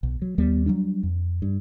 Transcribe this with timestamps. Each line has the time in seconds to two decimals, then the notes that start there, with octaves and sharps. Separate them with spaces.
0.03 B1
0.22 F#3
0.38 D#2 G3 B3
0.66 F#3 G3 D4
1.03 F2
1.42 G2